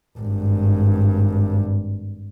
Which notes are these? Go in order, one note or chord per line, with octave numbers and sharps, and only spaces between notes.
G#1 G2